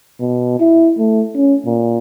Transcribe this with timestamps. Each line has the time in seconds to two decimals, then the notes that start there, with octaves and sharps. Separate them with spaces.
0.20 B2
0.60 E4
0.99 A3
1.36 C#4
1.66 A#2